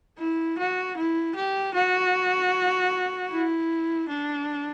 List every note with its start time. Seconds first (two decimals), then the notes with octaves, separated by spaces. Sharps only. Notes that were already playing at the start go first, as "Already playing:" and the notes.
0.18 E4
0.58 F#4
0.97 E4
1.35 G4
1.74 F#4
3.31 E4
4.08 D4